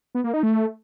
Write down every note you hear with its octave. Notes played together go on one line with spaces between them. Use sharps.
B3
A#3
D#4
A3